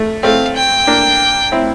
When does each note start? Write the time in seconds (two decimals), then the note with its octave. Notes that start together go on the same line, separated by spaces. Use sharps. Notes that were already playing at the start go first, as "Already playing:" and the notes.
Already playing: A3
0.23 A3 C4 F5
0.56 G5
0.87 A#3 D4
1.52 C4 E4